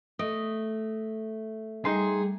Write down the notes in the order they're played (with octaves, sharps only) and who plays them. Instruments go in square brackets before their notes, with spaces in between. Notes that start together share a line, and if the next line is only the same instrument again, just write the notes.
[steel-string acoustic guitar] A3 [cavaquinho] D#5
[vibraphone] G3 [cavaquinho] D#4 C6 [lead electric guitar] G#4